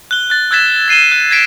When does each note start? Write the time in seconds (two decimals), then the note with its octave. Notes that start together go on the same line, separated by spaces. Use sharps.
0.11 F#6 G7
0.30 F#6 A6
0.51 E6 F#6 G#6 A6 B6 E7
0.88 A6 C7 D#7 E7 G7
1.12 F#6
1.30 F#6 G#6 A#6 B6 D7 E7